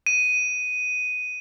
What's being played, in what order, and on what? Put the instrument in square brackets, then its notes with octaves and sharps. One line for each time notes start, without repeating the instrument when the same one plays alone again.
[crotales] D#7